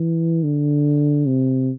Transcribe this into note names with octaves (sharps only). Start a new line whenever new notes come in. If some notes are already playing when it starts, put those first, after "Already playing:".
Already playing: E3
D3
C3